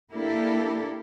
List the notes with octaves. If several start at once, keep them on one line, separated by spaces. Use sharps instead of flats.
A#3 D4 E4 G4 A4 A#4